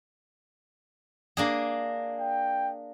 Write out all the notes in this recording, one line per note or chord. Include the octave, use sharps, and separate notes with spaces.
A#3 D4 G#4
G5